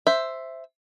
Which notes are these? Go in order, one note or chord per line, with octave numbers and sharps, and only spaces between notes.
C5 E5